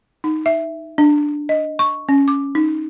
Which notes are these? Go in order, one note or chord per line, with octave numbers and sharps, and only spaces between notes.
D#4
E5
D4
D#5
C#6
C#4
D6
D#4